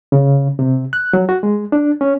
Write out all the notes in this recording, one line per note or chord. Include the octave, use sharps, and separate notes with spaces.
C#3
C3
F#6
F#3
F#4
G#3
D4
C#4